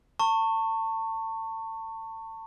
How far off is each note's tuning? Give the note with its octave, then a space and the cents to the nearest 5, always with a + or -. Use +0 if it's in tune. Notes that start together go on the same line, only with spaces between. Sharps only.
A5 +30 C#6 -10